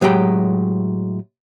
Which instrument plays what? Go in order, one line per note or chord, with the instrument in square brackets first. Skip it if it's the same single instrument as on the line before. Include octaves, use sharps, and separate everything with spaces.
[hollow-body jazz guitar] A2 F#3 G#3 G4 G5